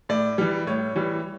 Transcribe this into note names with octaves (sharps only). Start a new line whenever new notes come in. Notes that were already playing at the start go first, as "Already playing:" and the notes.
A2 D5
E3 G3
A2 C#5
E3 G3